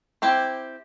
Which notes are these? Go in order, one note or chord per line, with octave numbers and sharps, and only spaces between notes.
C4 E4 G4